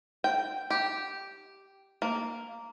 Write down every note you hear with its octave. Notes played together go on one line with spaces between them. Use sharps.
G5
G4
A#3